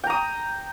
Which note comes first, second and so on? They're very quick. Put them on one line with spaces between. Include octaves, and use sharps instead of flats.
G5 A#5 D#6